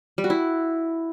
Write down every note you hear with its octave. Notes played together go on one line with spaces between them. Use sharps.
G3
F#4
E4